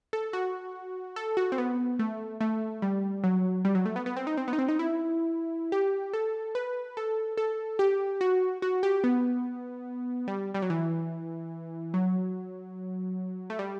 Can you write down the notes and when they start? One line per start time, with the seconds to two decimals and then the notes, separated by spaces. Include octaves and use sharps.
0.13 A4
0.33 F#4
1.16 A4
1.37 F#4
1.52 C4
1.58 B3
1.99 A3
2.41 A3
2.82 G3
3.24 F#3
3.65 G3
3.75 F#3
3.86 A3
3.96 B3
4.06 B3
4.17 C4
4.27 D#4
4.37 C4
4.48 B3
4.53 D#4
4.59 C4
4.68 D#4
4.79 E4
5.72 G4
6.14 A4
6.55 B4
6.97 A4
7.37 A4
7.79 G4
8.21 F#4
8.62 F#4
8.83 G4
9.04 B3
10.28 G3
10.54 G3
10.62 F#3
10.70 E3
11.94 F#3
13.50 A3
13.59 G3